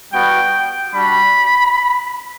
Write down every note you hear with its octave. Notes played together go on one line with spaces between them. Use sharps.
G3 B3 F#4 G5
G3 D4 F#4 B5